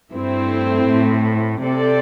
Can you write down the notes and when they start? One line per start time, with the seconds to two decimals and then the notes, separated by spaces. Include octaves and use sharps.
0.12 G2 A3 C4 E4
0.87 A2
1.63 C3 C4 A4 D5